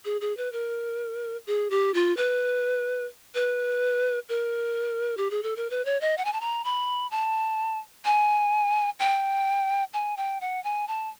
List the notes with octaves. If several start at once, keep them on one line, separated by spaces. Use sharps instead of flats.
G#4
G#4
B4
A#4
G#4
G4
F4
B4
B4
A#4
G4
G#4
A4
A#4
B4
C#5
D#5
F#5
G#5
A5
A#5
B5
A5
G#5
G5
G#5
G5
F#5
G#5
A5